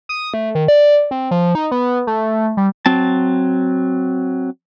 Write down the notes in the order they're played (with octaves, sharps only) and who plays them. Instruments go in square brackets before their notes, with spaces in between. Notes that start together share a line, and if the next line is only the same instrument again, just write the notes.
[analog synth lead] D#6
A3
D#3
D5
C4
F3
D#4
B3
A3
G3
[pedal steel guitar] F#3 C4 A5